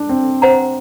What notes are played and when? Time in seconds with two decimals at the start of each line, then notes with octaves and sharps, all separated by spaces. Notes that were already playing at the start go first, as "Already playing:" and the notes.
Already playing: D4
0.09 C4
0.42 C5 F#5 A#5